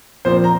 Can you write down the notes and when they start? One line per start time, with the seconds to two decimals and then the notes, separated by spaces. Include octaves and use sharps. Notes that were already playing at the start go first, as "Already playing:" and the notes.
0.25 A#2 F3 C4 C5
0.44 A#5